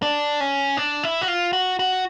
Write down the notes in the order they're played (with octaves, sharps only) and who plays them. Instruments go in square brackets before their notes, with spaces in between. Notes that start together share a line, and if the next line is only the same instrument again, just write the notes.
[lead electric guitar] D4
C#4
D4
E4
F#4
F4
F#4
F#4